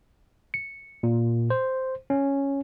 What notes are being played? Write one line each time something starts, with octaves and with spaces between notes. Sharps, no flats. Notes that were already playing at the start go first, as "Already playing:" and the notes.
C#7
A#2
C5
C#4